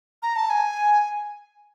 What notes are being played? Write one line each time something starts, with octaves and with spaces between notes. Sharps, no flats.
A#5
A5
G#5